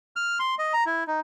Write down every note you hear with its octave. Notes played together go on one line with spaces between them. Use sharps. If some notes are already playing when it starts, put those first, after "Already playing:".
F6
C6
D#5
A#5
E4
D#4